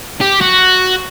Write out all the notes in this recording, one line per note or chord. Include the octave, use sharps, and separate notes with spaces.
G4
F#4